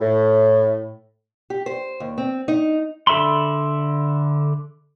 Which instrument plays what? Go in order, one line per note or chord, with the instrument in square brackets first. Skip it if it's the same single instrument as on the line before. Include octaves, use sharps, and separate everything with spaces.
[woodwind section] A2
[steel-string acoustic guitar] G4
C5
D#2
C4
D#4
[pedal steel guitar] D3 A4 E5 B5 C6